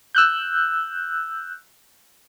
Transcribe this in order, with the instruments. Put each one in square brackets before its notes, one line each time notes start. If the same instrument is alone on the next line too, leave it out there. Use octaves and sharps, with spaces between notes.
[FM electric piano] E6 F#6 G6